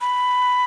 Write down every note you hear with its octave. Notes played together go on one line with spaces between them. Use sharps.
B5